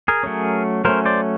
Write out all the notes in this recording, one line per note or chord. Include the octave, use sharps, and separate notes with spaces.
G#4 A#4
F#3 A3 C#4
F#3 A3 C#4 A#4 C5
C5 D5